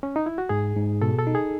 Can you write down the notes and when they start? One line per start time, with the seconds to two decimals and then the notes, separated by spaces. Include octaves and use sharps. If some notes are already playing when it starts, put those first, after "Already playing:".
0.03 C#4
0.16 D#4
0.26 E4
0.38 F#4
0.49 G#2 G#4
0.76 G#2
1.02 B2 A4
1.19 A4
1.27 D#4
1.35 G#4